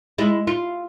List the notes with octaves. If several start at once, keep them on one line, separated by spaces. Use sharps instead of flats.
G#3 E4
F4